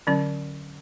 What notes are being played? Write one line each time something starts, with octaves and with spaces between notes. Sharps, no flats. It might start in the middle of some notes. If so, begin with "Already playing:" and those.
D3 F#3 C#4